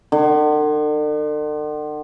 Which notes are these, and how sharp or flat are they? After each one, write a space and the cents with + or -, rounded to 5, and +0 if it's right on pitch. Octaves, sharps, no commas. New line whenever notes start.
D3 +45